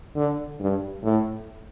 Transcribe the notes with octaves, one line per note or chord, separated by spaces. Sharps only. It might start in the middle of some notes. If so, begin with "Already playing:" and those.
D3
G2
A2